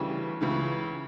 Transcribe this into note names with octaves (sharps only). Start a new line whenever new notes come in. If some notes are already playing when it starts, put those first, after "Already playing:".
Already playing: D2 C#3 E3 G3
C#2 C#3 E3